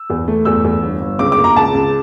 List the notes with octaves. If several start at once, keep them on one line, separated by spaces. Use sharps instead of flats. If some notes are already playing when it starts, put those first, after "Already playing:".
Already playing: E6
E2
A3
E2 E6
E2
G1
G1
C#2 D6
D6
A#3
A#5
C#2 A5
C#2